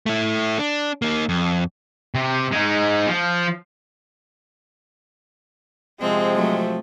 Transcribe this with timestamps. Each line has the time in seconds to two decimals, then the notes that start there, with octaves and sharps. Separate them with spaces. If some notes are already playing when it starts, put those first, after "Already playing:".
0.06 A3 E4
0.59 D4
1.02 A#3 D#4
1.29 F2
2.15 C3
2.51 G#3 D#4
3.07 F3
6.01 C3 F3 G#3 C4
6.35 F#3 A3